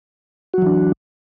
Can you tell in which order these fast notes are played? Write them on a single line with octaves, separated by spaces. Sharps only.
F#4 F#3 E3 D4